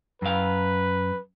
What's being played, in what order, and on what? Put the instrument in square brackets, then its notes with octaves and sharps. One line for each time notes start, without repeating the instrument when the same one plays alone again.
[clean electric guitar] F#2 F5 [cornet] B4